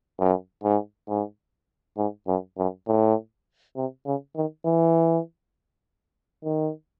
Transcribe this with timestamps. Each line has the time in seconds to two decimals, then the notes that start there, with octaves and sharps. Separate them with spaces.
0.19 F#2
0.63 G#2
1.08 G#2
1.97 G#2
2.27 F#2
2.58 F#2
2.87 A2
3.76 C3
4.06 C#3
4.36 D#3
4.66 E3
6.44 D#3